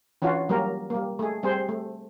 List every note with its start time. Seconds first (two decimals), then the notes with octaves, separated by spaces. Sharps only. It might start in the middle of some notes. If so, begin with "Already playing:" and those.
0.22 E3 C#4 D4 F4 F#4
0.49 F#3 G3 A#3 A#4
0.90 G3 A#3
1.19 A3 G#4
1.43 G3 C4 G#4 C5
1.69 A3